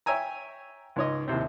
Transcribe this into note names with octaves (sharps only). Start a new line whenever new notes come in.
C#5 E5 G5 G#5 A#5
C#2 G#2 C#5 D#5
D#2 A2 C3 C4